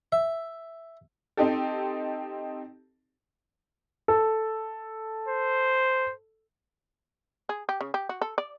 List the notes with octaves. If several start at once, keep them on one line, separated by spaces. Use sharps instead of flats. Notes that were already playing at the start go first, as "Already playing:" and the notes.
E5
C4 D#4 G4 A4
A4
C5
G#4
G4
C#3
G4
F#4
A4
D5